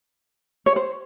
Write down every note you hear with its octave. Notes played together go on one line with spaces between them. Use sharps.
C#5
C5